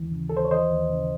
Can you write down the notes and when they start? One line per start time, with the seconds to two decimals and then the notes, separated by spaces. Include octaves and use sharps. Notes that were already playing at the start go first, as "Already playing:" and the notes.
Already playing: D#2 E3
0.12 C#3
0.30 A4
0.32 D#2 C5
0.45 C#5
0.51 E3 C5 D#5
0.70 D#2
0.90 C#3